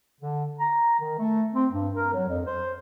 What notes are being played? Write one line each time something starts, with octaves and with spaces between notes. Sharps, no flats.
D3
A#5
D#3
A3
C4
G2
A#4
F#3
F2
C5